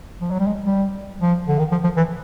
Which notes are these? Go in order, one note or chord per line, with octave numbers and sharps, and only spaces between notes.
F3
F#3
G3
G#3
G3
F3
D3
D#3
F3
F3
E3